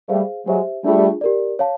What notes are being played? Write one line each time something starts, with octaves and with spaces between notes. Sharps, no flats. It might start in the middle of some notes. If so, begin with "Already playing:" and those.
G3 A3 G#4 C5 F5
F#3 G#3 G4 C5 E5
G3 A3 D4 F4 G#4
G4 A#4 D5
C#5 F5 A5